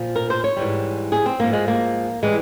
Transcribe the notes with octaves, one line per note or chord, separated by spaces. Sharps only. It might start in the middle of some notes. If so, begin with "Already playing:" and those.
Already playing: A#2 F3
A#4
C5
C#5
G#2 E3 G3
G#4
C4
G#2 F3 A#3
G#3
A#3
E3 G3 G#3